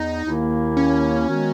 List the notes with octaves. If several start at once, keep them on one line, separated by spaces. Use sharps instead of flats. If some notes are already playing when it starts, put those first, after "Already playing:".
Already playing: E2 D#4
D#2 D#3 A#3 E4
C#4
D#3 G#3 B3 F#4